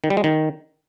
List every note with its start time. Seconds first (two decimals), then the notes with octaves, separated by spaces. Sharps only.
0.04 D#3
0.10 G3
0.17 G#3
0.24 D#3